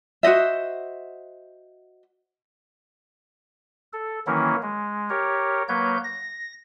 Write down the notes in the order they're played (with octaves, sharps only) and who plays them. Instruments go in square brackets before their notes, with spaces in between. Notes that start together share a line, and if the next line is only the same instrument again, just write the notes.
[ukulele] F#4 C5 D#5 E5
[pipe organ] A4
D#3 E3 F#3 A#3 C#4 E4
G#3
G4 A#4 C#5
F#3 A#3 B4 C#5 G6
A#6